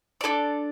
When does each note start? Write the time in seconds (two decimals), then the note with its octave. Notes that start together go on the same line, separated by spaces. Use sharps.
0.21 D4 A4 D5